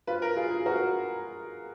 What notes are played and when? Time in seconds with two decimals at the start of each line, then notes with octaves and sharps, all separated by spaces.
0.07 F4 B4
0.22 A#4
0.36 F4 G#4
0.51 G#4
0.66 F#4 A#4